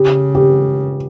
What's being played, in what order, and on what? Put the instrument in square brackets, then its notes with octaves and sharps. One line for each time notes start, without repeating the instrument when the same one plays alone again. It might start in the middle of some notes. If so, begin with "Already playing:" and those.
Already playing: [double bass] C#3 [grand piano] G4
[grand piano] G4